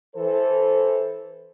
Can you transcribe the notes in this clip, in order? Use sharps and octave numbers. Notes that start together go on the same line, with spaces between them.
E3 A4 C5